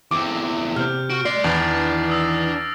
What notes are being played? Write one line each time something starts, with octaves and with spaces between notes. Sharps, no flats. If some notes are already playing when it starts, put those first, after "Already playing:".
E2 C4 D6
C3 F6 G6
F#4 F6 D7
D5 D#5 C6 C7
E2 D#3 E3 D4 A6 F7 F#7
D#6 E6 A#6